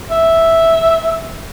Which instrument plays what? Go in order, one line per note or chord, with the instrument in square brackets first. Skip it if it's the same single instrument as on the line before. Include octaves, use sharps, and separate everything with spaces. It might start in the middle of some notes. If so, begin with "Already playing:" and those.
[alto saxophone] E5